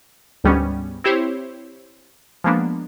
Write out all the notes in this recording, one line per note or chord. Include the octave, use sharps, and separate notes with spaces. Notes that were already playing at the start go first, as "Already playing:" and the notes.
D2 G#2 G3 B3 C#4
C4 E4 G4 C5 C#5
F3 G#3 A#3 B3 D4